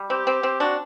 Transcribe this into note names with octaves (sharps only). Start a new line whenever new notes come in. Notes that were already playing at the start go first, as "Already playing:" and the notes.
Already playing: G3
C4 G4
C4
C4
D4 F#4